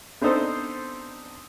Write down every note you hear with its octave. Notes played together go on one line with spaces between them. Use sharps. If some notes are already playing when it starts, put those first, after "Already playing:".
B3 C4 D4 D#4 A4 C5